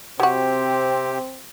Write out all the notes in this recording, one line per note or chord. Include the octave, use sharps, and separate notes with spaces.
C3 F#3 C4 F#4 G4